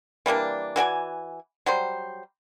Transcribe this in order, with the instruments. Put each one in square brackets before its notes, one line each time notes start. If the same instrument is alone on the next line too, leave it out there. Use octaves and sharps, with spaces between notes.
[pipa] E3 G3 A#3 D4
E3 F#4 D5 G#5
F#3 G3 C5